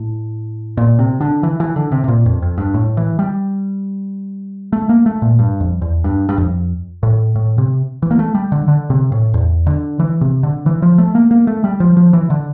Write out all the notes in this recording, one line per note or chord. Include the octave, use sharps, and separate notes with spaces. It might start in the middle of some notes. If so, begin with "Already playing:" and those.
Already playing: A2
A#2
C3
D3
E3
E3
D3
C3
C3
A#2
F2
F2
G2
A2
E3
G3
A3
A#3
A3
A#2
G2
F2
E2
G2
G2
F2
A2
A2
C3
E3
A#3
A3
G3
D3
D3
C3
A2
E2
D3
E3
C3
D3
E3
F3
A3
A#3
A#3
A3
G3
F3
F3
E3
D3